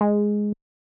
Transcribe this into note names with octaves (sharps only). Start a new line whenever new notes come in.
G#3